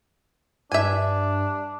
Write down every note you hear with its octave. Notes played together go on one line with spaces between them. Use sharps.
G2 D4 E5 G#5